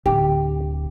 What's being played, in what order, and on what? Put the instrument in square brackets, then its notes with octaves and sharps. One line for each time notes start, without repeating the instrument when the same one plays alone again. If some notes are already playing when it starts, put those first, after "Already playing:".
[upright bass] D1 [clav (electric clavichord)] G4